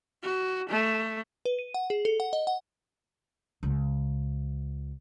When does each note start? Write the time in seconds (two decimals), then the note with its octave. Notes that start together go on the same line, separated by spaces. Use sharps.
0.22 F#4
0.69 A3
1.45 B4
1.59 D#7
1.74 F#5
1.90 G#4
2.05 A4
2.20 F#5
2.33 D#5
2.47 F#5
3.63 C#2